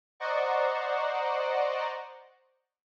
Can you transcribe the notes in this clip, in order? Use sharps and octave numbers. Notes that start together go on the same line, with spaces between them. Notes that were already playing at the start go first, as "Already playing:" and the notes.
C5 D5 D#5 F#5 A#5 C#6